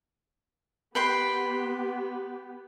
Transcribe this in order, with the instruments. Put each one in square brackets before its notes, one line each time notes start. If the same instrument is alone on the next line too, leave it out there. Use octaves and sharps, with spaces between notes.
[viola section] B3 G4 [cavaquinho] B4 G5 C6